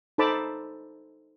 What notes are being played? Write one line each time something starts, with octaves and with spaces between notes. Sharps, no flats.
D#4 A4 C5 A5 B5 D6